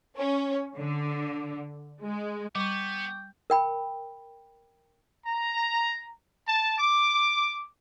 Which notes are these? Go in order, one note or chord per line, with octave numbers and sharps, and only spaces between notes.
C#4
D3
G#3
G3 B3 G5 C#6 D6
A#4 G5 B5
A#5
A5
D6